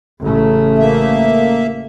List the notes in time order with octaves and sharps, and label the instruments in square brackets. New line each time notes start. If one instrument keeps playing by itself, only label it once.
[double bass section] A1 C#3 A3
[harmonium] A#3 E5